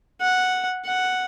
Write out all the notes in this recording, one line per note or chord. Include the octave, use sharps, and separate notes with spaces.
F#5
F#5